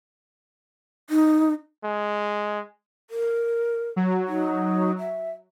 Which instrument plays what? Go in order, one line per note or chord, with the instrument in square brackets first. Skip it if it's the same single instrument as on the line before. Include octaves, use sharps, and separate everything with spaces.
[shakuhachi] D#4
[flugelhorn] G#3
[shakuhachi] A#4
[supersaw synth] F#3
[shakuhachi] D#4
E5